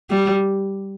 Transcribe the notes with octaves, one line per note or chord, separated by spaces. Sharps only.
G3